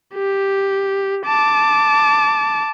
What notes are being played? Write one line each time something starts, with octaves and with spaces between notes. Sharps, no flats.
G4
A5 D6